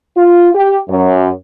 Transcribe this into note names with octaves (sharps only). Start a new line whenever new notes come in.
F4
G4
F#2